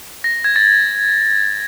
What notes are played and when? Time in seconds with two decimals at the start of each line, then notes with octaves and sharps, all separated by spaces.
0.24 A#6
0.44 G#6
0.56 A6